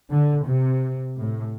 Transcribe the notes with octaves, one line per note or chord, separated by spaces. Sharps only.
D3
C3
A2